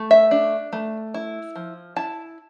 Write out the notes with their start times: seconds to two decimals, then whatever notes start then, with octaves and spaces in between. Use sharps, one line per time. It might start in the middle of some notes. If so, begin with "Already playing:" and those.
Already playing: A3
0.11 E5
0.31 D4
0.73 A3
1.14 E4
1.56 F3
1.96 E4 A5